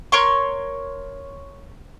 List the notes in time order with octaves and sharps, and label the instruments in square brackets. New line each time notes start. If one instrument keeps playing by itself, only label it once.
[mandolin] A#4 C#5 C6 C#6